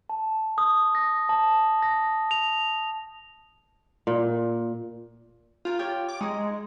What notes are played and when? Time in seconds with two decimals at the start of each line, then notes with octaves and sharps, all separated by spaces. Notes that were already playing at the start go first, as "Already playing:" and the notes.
0.09 A5
0.58 D#6
0.95 A#6
1.29 A5
1.82 A#6
2.31 F7
4.07 A#2
5.65 F4 A#4 C5
5.79 G4 C#5 G5
6.08 D6
6.21 G#3 D#4 D#5